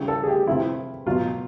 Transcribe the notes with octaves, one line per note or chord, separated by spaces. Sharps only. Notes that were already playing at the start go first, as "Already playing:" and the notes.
Already playing: C#3 E3 G3 G4
A4
G#4
G4
C3 F3 E4
B2 F#3 F4